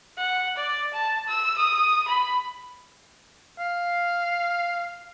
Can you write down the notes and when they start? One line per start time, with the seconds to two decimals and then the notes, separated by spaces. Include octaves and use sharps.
0.18 F#5
0.56 D5
0.93 A5
1.28 E6
1.58 D#6
2.08 B5
3.59 F5